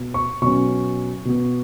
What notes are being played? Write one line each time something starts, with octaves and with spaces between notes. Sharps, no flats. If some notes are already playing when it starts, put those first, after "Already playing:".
Already playing: B2
C#6
B2 F#3 C#4 C#6
B2 B3